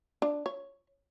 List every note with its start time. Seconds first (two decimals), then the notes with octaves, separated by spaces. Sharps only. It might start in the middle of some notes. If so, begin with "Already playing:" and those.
0.22 D4
0.46 C#5